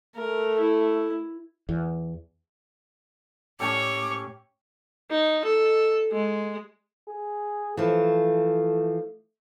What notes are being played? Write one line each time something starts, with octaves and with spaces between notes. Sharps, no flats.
A3 A#4
E4
E2
A2 C#4 G4 A4 C#5 D6
D#4
A4
G#3
G#4
E3 F3 A3